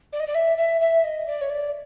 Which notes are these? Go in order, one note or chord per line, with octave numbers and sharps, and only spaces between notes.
D5
D#5
D5
E5
E5
E5
D#5
D5
C#5
D5